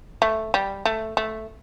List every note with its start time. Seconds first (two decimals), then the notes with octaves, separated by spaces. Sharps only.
0.22 A3
0.54 G3
0.86 A3
1.17 A3